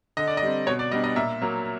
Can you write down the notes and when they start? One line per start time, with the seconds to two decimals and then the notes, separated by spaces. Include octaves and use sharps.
0.17 D3 D#5
0.27 D5
0.37 D#5
0.42 G3 C4
0.67 B2 C#5
0.79 D5
0.92 G3 B3 D4 D#5
1.04 D#5
1.16 A#2 E5
1.42 F#3 A#3